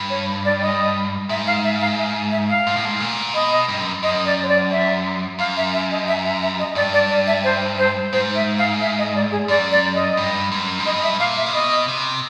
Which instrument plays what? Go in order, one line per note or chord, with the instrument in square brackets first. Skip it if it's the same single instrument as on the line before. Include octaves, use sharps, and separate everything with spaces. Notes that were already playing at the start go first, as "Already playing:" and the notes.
Already playing: [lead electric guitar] G2
[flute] C#5
D5
D#5
[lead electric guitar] G#2 [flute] E5
[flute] F5
E5
F5
E5
E5
F5
[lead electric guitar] G#2
A2
G#2
A#2
[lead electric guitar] B2 [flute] D#5
[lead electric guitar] G2
F#2
[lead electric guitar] F#2 [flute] D#5
[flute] D5
C#5
D5
E5
[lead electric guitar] F#2 [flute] F5
[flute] E5
E5
D#5
E5
E5
E5
D#5
[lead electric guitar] G2 [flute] D5
[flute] D5
D5
E5
C5
C5
[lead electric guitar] G#2 [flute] C5
[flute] E5
F5
E5
D#5
D5
G#4
[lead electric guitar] F#2 [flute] D5
[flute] D5
D#5
[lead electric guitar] G2
F#2
G#2
[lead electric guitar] G2 [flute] D#5
[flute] E5
[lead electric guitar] A#2 [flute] F5
[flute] E5
[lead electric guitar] C3
[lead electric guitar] B2 [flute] D#5
[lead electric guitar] C3